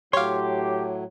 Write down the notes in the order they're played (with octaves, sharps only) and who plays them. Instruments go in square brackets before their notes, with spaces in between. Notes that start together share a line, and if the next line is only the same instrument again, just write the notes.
[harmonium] A2 F#3 [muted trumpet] G4 [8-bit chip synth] C#5 F5 [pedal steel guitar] C6 D6